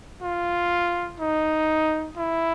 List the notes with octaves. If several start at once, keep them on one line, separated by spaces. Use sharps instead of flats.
F4
D#4
E4